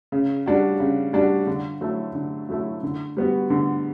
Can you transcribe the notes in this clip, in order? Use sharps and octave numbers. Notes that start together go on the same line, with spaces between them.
C#3
G3 D4 F#4
C#3
G3 D4 F#4
D3
F#3 A3 E4
D3
F#3 A3 E4
D3
G3 B3 F#4
D3